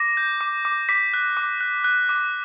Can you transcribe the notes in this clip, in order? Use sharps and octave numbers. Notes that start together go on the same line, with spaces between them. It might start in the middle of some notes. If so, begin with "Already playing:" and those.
Already playing: D6 A#6
G6
D6
D6
D6 B6
F#6
D6
F#6
F#6
D6